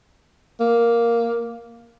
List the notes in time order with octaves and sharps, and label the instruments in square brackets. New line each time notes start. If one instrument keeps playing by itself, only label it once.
[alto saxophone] A#3